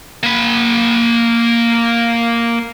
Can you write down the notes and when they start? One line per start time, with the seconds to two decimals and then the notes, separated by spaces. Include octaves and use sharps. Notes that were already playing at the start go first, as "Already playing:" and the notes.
0.23 A#3 B5